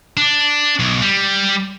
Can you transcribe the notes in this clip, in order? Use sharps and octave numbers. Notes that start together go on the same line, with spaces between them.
D4
B1
G3